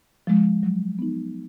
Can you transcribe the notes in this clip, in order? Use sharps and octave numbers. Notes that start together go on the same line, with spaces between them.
F3 G#3
F#3
B3 D#4